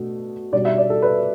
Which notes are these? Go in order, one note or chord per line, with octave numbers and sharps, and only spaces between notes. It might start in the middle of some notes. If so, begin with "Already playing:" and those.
Already playing: B2 A3 D4
B2 G3 D4 D5
E5
D5
A4
B4